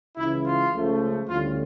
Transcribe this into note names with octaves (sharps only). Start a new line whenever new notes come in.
C#2 C#3 E3 E4
F4
C#2 C#3 F3 A3
D2 D3 G3 C#4 E4 F4